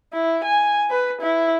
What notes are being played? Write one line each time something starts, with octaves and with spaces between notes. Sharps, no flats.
E4
G#5
B4
E4